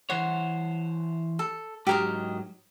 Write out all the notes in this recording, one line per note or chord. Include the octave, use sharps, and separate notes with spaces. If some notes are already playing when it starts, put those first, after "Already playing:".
E3 C5 C#5 F#5
A4
G#2 F#3 G4 A#4 D#5